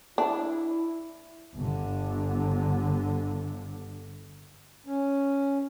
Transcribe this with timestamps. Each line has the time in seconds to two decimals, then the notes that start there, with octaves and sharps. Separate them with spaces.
0.18 D4 E4
1.55 G1 D3
4.86 C#4